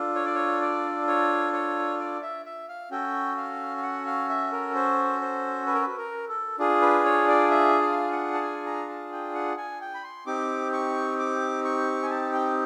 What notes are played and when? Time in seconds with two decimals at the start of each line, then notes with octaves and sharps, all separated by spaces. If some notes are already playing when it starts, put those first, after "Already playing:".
Already playing: D4 F4 A4
0.15 C#5
0.26 D5
0.35 C#5
0.61 D5
1.08 C#5
1.53 C#5
2.00 D5
2.22 E5
2.45 E5
2.69 F5
2.91 C#4 F#4 A4 G5
3.37 F5
3.77 F5
3.83 F#5
4.06 F5
4.29 E5
4.52 A#4
4.75 C5
5.21 C5
5.67 B4
5.74 A#4
5.81 B4
5.98 A#4
6.28 A4
6.59 D4 F4 G#4
6.82 B4
7.05 C#5
7.28 D5
7.51 E5
7.82 F5
8.12 F#5
8.34 A5
8.42 G#5
8.66 A#5
8.89 A5
9.12 G5
9.35 F#5
9.58 G#5
9.81 G5
9.94 B5
10.04 C6
10.26 C4 D#4 G4 D6
10.73 C#6
11.19 D6
11.65 C#6
12.03 G#5
12.10 A5
12.33 G5